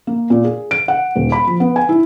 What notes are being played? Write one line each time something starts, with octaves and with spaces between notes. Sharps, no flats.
A#3
A#2
G#4
D7
F#5
D#1
B5
F3
B3
G#5
E4